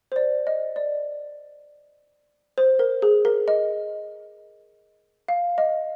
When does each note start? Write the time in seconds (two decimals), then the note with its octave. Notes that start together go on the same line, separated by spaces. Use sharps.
0.12 C5
0.16 D5
0.47 D#5
0.76 D5
2.58 C5
2.79 A#4
3.02 G#4
3.25 A#4
3.48 D#5
5.28 F5
5.58 D#5